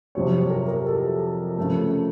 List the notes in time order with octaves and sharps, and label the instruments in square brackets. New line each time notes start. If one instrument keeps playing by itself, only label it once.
[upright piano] F2 C3 F#3 C4 C#5
C#5
A#4
A#4
A4
C#3 F3 A3